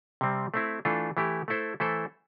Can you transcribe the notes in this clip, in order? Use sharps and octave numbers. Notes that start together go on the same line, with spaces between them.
C3 G3 C4
A3 C4 E4
E3 A3 D4 F4 A4
E3 A3 E4 G4
A3 E4 A4 C5
E3 A3 E4 A4 C5